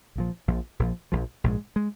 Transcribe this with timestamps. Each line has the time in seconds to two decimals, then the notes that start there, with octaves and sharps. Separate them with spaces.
0.16 A#1 A#2 F3
0.48 A#1 A#2 F3
0.79 A#1 A#2 F3
1.12 A#1 A#2 F3
1.44 A#1 G#2 G#3
1.76 G#3